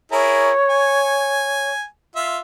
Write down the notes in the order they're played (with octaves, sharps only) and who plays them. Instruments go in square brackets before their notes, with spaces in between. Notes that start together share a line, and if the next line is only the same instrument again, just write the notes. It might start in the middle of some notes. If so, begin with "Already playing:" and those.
[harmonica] E4 G#4 A#4 [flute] C#5
[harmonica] G#5
F4 E5